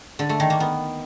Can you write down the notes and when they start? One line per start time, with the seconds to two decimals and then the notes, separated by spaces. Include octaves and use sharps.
0.19 D3
0.29 A3
0.40 D#3
0.50 A#3
0.60 B3